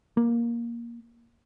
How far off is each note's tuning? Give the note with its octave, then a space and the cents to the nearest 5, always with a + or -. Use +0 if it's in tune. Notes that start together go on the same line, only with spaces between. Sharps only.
A#3 +10